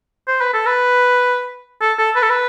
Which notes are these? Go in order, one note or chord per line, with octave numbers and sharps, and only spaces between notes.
C5
B4
A4
B4
A4
A4
B4
A4
B4